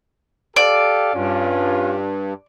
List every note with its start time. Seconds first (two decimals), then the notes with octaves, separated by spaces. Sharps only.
0.56 G4 A4 D5 F5
1.14 G2 C#4 D4 F4